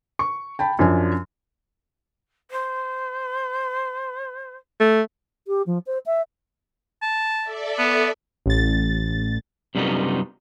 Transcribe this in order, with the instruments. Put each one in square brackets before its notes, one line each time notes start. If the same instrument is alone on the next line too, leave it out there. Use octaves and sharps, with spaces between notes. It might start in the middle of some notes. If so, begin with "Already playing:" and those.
[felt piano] C#6
G5 A5 B5
F#2 F3 D4 G#5
[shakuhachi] C5
[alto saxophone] A3
[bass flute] G4
F3
C5
E5
[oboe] A5
[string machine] A4 D5 E5
[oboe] B3
[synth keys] A1 A6
[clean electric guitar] F#2 C3 G3 B3 D#4 F4